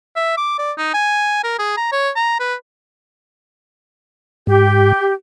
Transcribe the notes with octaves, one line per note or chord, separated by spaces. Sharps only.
E5
D6
D5
D#4
G#5
A#4
G#4
A#5
C#5
A#5
B4
G#2 G4